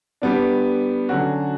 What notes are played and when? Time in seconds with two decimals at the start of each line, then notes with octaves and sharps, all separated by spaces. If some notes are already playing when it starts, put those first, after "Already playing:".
0.22 G3 B3 D4
1.09 D3 F#3 C#4 F#4